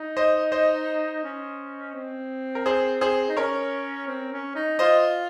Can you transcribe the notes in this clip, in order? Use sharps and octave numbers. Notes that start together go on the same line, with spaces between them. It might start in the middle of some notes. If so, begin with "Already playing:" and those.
Already playing: D#4
C5 D#5
C5 D#5
C#4
C4
A#4
G#4 C5
G#4 C5
D#4
C#4 A#4 C#5
C4
C#4
D#4
F4 C5 D#5